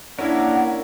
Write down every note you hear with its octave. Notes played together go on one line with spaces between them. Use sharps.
A#3 C#4 D4 E4 A#4 F#5